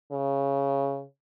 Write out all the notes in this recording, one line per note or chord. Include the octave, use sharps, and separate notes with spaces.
C#3